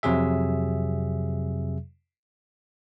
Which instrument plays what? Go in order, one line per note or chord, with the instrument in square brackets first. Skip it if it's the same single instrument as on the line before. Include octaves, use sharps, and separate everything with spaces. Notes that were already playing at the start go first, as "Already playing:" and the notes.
[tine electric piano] F2 C3 F#3 G#4 E5